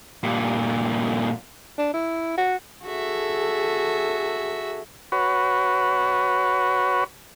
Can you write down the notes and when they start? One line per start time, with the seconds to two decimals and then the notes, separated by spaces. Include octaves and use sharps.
0.23 G2 A#2
1.78 D4
1.94 E4
2.38 F#4
2.85 F#4 G#4 A4 E5
5.12 F#4 B4 C#5